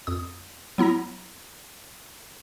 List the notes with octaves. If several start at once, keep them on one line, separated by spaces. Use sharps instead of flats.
F2 D#6
F#3 B3 E4 A#5 A#6